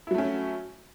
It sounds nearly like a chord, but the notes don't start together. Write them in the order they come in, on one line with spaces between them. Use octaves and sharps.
E4 F#3 A3 C#4